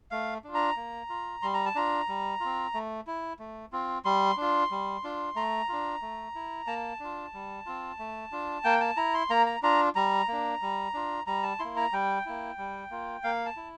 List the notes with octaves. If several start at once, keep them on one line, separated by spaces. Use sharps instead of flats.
A3 F5
D4 F4
A#5
A#3
F4
G3 C6
A#5
A5
D4 F4 A#5
G3
C4 F4
A3
E4
A3
C4 F4
G3 C6
D4 F4
G3
D4 F4
A3 A#5
D4 F4
A3
E4
A#3 A5
D4 F4
G3
C4 F4
A3
D4 F4
A#3 G5
A5
E4 A#5
C6
A#3 A#5
A#5
D4 F4 A#5
G3 A#5
A#3 D4
G3
D4 F4
G3 A#5
A5
A#3 E4 C6
A#5
G3 G5
A#3 E4
G3
A#3 F4
A#3 F5
A5
E4